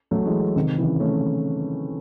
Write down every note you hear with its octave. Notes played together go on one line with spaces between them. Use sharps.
F#3 A3
E3 G#3
C3 D#3
C#3 E3
A3 C#4